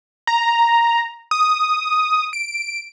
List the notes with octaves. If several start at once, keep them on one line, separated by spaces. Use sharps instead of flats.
A#5
D#6
D7